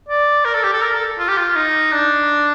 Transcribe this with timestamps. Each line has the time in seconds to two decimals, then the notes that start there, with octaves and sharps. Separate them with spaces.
0.08 D5
0.45 A#4
0.54 A4
0.63 G4
0.73 A4
0.82 A#4
0.94 A4
1.18 F4
1.28 G4
1.37 F4
1.55 D#4
1.92 D4